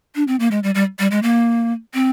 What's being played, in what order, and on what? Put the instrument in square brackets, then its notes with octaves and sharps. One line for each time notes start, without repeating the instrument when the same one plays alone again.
[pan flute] D4
C4
A#3
G#3
G3
G3
G3
G#3
A#3
C4